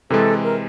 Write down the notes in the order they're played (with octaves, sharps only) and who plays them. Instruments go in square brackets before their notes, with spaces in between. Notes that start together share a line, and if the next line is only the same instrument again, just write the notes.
[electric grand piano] C3 E3 G#3 [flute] A4
[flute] A#4